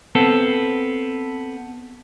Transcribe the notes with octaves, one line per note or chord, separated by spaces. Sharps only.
B3 C4 A4